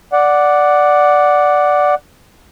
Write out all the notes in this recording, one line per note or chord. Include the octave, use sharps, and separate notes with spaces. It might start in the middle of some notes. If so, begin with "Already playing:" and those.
D5 F#5